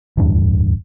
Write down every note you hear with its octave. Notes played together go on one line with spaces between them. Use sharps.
D1 E2 G2 D4